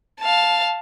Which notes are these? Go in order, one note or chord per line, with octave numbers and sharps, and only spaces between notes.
F5 A5